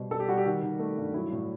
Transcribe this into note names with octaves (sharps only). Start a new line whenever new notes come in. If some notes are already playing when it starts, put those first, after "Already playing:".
Already playing: B2 G3 C5
G3 A4
G4
G3 F#4
G4
D#3 F#4
D#3
A3
G2
F#3 E4
A2